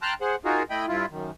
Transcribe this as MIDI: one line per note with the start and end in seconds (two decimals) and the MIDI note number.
0.02 0.14 79
0.02 0.14 81
0.02 0.14 82
0.02 0.14 84
0.02 0.14 89
0.02 0.14 90
0.21 0.36 68
0.21 0.36 72
0.21 0.36 78
0.45 0.63 63
0.45 0.63 65
0.45 0.63 66
0.45 0.63 68
0.45 0.63 70
0.70 0.86 57
0.70 0.86 64
0.70 0.86 75
0.70 0.86 79
0.70 0.86 83
0.88 1.06 43
0.88 1.06 64
0.88 1.06 65
1.11 1.31 42
1.11 1.31 51